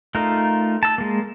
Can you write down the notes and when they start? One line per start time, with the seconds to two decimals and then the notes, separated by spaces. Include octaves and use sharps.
0.15 A3 D#4 F4 A#4
0.83 A5 E6
0.98 G#3 A#3